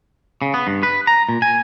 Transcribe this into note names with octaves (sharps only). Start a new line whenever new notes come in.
C#3
B3
G2
B4
A#5
A#2
G#5